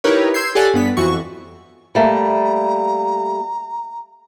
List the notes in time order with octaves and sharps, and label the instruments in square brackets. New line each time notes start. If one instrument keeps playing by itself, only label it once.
[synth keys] D#4 E4 G4 A#4 B4 C#5
C6 E6 G6 G#6 C7
G4 A4 C#5 D5 F#5 G#5
G2 B3 B6
F2 E3 F#4 C#6
[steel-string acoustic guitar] G3 A3 A#3 [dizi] A#5